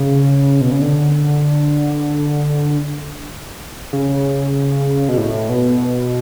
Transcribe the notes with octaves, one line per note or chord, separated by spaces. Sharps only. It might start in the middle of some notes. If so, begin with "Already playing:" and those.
Already playing: C#3
B2
C#3
D3
C#3
B2
A2
B2